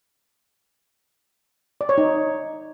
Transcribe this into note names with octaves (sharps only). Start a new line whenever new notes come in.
D5
C#5
D#4